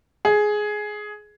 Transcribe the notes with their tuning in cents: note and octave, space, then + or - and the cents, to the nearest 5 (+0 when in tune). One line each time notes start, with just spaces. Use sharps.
G#4 +10